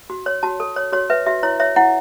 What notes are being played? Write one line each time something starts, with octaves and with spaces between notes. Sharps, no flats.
F#4
C#5
F#4 A5
A4
C#5
F#4 C#5
B4 E5
F#4 E5
E4 C#5
C#5 E5
E4 F#5